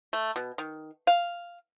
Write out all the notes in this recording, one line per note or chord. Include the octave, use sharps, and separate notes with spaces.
A3
B2
D#3
F5